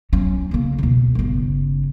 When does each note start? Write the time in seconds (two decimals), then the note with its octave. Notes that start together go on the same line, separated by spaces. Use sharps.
0.13 F#3 C#4
0.51 C#3 A#3
0.78 D2 B2
1.15 G1 C#3